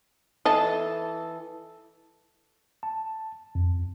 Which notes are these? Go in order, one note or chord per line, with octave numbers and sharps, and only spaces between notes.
E3 A4 D#5 A5
A5
F2